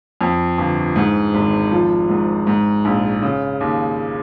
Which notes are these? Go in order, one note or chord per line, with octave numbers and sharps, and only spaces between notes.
F2
G1
G#2
G#1
F3
G#2
G#2
A#1
C#3
D#2